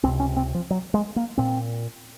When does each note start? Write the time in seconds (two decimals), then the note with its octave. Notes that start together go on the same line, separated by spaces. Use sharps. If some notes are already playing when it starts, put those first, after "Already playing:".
0.04 C#2 C3 C4
0.20 C#4
0.36 C4
0.55 F3
0.70 F#3
0.94 G#3
1.16 A#3
1.38 A#2 C4